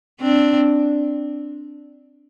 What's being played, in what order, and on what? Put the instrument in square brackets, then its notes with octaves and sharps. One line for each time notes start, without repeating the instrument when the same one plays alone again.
[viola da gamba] C4 D4